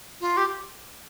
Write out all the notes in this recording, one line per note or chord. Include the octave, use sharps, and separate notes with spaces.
F4
G4